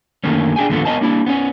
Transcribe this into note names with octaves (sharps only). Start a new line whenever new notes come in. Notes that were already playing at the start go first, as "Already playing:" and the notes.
F#2 D3 D#3 A3 A#3 C#4
D4 G#4 G5 G#5
D#2 A2 D3 F3 A3 B3
B3 A#4 C#5 D#5 G#5 A5
A#3 D4 E4
B3 C#4 C#5